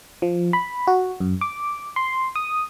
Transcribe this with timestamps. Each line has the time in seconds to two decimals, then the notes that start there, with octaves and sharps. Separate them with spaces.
0.22 F3
0.53 B5
0.87 F#4
1.20 F#2
1.41 D6
1.96 C6
2.35 D#6